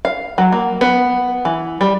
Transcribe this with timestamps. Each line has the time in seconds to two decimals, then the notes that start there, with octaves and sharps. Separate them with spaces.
0.05 F5
0.38 F#3
0.52 A#3
0.81 B3
1.45 E3
1.81 G3